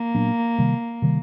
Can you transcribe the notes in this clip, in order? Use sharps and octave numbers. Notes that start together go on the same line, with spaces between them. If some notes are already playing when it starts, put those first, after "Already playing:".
Already playing: A#3
A#2 F#3 B3 D4
C3 D#3 G3
C3 D#3 G3